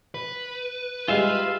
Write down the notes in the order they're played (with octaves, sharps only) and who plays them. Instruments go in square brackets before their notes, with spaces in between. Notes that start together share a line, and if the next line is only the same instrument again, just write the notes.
[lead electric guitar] B4
[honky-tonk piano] G3 G#3 [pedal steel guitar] F4 E5 F5